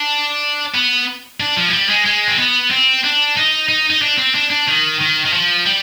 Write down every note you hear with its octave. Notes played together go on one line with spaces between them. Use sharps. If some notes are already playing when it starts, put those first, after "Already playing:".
Already playing: D4
B3
D4
F3
G#3
G3
G#3
G#3
C4
B3
C4
D4
D#4
D#4
D#4
D4
C4
D4
D4
D#3
D#3
D#3
F3
G3